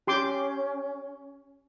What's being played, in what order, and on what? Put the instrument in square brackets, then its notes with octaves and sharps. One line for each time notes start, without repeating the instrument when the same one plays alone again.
[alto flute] C#4 [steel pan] G4 C6 D6